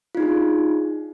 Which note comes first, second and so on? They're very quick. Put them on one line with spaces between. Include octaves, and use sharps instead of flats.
F4 D#4 G#4 D4